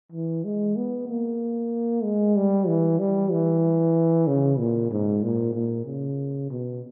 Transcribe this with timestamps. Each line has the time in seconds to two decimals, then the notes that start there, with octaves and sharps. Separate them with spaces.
0.12 E3
0.45 G#3
0.76 B3
1.09 A#3
2.03 G#3
2.36 G3
2.67 E3
2.99 G3
3.32 E3
4.27 C#3
4.59 A#2
4.91 G#2
5.23 A#2
5.54 A#2
5.86 C#3
6.50 B2